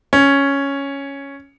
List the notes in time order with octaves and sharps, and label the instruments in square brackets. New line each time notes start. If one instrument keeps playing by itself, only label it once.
[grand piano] C#4